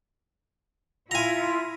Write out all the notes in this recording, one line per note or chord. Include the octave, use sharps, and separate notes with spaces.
E4 F4 G#5 A#5